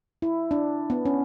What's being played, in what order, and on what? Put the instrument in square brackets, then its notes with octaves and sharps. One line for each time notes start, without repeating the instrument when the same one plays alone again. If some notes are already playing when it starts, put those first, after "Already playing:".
[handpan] E4
D4
B3
C#4